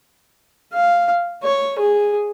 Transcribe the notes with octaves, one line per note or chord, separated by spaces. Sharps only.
F5
C#5
G#4